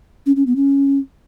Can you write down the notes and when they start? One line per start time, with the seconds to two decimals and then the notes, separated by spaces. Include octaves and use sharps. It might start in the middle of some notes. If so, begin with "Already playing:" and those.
0.26 C#4
0.36 C#4
0.47 B3
0.56 C#4